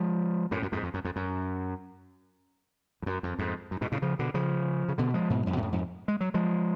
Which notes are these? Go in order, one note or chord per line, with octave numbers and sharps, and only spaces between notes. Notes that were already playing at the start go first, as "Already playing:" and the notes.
Already playing: F3 G#3
F#2 A2
F#2
F2 G#2
F2
F#2
F2
F#2
F2
F#2
F2
F2 G#2
F#2
G#2 B2
A2 C#3
C#3 F3
B2 D3
C#3 F3
C#3
B2 D3
F3 G#3
G#2 B2
F2 G#2
B2
F#2 A2
F2 G#2
G#3
F#3
F3 G#3